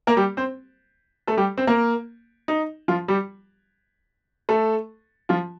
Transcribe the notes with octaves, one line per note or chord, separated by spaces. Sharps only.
A#3 A#4
G3 G4
C4 C5
A3 A4
G3 G4
C4 C5
A#3 A#4
D#4
F3 F4
G3 G4
A3 A4
F3 F4